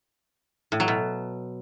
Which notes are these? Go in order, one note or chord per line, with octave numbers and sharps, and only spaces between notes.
A2
F#3
B2